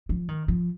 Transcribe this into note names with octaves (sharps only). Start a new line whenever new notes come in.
F3
D#3
F3